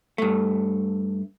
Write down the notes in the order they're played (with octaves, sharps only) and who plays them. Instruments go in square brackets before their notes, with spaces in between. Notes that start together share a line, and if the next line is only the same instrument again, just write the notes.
[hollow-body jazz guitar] G2 A3